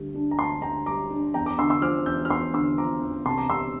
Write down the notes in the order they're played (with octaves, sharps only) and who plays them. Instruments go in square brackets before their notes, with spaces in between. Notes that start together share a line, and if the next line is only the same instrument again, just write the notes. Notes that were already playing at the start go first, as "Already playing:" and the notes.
Already playing: [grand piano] D2 D3 G3
D4
A#5
D2 A5 C6
D3 G5 A#5
G3 A#5 D6
D4
E2 G5 A#5
A#5 D6
D3 C6 E6
C6 E6
F3 D6 F6
E2 E6 G6
F6
E2 C6 E6
D3 C6 E6
F3 A#5 D6
E2
C2 A5 C6
A#5 D6
C3 C6 E6